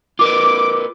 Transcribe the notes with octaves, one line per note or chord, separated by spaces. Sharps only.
F4 A#4 B4 D6